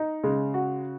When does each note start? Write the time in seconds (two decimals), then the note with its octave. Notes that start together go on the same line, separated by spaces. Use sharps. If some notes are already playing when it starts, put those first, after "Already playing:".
Already playing: D#4
0.24 C#3 G#3
0.54 F#4